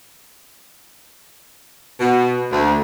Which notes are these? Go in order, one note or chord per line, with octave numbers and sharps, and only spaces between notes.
B2
D2